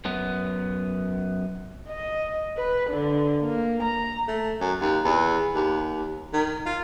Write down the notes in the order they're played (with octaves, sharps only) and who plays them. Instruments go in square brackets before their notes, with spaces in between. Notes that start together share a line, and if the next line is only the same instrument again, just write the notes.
[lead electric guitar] F#2 B3
[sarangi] D#5
B4
D3
A#3
A#5
[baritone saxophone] A3
F#2
D#2
E2
D#2
D#3
F4